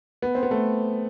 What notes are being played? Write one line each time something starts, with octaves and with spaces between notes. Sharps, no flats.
B3
C4
B3
A3